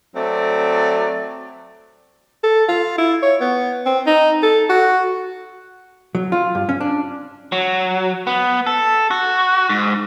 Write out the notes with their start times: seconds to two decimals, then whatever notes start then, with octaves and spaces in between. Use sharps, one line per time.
0.16 F#3 A3 C4 D5
2.43 A4
2.68 F4
2.98 E4
3.22 C#5
3.41 B3
3.86 C4
4.07 D#4
4.43 A4
4.69 F#4
6.15 F#3
6.32 F4
6.55 G2
6.69 C#4
6.81 D4
7.52 F#3
8.27 B3
8.67 A4
9.11 F#4
9.69 G#2